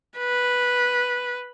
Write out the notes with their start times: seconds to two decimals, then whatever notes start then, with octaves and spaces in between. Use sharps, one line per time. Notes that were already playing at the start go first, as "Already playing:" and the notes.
0.17 B4